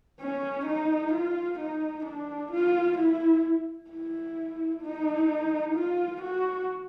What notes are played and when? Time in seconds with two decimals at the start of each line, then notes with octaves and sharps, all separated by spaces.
0.20 C#4
0.66 D#4
1.13 F4
1.59 D#4
2.05 D4
2.52 F4
2.98 E4
3.91 E4
4.82 D#4
5.75 F4
6.22 F#4